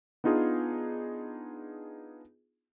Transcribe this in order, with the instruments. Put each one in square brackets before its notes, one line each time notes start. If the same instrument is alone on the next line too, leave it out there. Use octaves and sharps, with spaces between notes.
[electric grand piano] B3 D4 D#4 F4 G#4